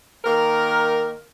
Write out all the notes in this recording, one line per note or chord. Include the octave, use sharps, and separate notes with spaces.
D#3 A#3 A#4